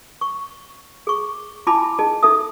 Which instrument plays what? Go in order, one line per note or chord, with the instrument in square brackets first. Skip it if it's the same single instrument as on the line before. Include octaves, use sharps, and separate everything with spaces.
[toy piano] C#6
G#4 C#6
E4 F4 G#5 A5 B5 D6
D#4 G#4 D#5 A5
D#4 A4 E5 D#6